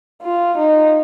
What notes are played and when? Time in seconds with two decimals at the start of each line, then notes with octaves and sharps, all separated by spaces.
0.22 F4
0.57 D#4